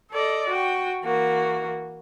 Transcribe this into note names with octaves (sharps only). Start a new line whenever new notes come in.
A4 D5 D#5
F#4 G5
E3 A#3 F#4